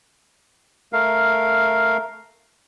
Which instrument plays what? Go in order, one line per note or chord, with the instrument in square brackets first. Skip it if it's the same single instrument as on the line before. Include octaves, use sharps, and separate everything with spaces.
[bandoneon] A3 A#4 F5